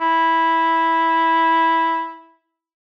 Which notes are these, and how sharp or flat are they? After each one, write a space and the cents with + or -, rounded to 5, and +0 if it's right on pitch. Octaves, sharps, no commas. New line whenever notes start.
E4 -10